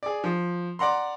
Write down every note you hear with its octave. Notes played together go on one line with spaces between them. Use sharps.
G#4 D5
F3
D5 F#5 A#5 C6